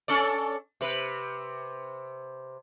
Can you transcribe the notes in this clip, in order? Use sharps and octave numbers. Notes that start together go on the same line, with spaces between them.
C#4 A4 D5
C3 B4